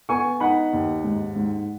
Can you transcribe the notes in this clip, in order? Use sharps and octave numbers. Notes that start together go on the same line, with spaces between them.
B3 G#5 C#6
D#4 F#5 B5
D#2
G#2
G#2